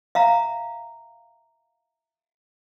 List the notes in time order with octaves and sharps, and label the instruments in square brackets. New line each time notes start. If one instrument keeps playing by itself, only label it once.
[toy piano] E5 F5 A#5